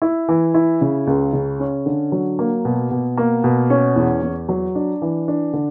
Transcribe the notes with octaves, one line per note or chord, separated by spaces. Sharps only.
E4
E3
E4
C#3
C#2
C#3
C#4
D3
F#3
A#3
B2
B2
A#3
B2
C#4
E2
E2
F#3
D4
E3
D4
D3